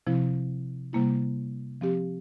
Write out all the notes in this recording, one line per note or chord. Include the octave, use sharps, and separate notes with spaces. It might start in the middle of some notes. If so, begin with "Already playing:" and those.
C3 F3 C4 E4
C3 G3 A#3 E4
F3 C4 G4